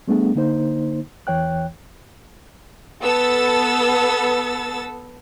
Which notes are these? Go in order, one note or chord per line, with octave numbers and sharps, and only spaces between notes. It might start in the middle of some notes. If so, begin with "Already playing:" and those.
G3 A3 B3 D4 G#4
D3 A#3 D#4 C5
E2 E3 C#5 G5 F#6
B3 A4 E6 A6